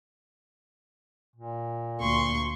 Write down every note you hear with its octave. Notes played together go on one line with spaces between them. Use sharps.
A#2
D2 A#3 C6 C#6